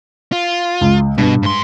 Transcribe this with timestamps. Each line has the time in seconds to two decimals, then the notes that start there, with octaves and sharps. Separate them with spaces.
0.32 F4
0.81 C#2
1.18 G2 B2
1.43 G#2 C6